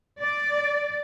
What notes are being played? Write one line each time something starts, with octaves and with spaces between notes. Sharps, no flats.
D5